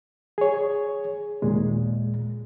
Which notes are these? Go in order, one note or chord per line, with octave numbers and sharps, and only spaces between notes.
G#4 C#5
D#2 A#2 G#3